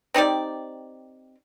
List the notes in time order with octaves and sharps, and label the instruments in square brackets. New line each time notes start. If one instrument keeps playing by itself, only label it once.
[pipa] C4 D#4 G4 D5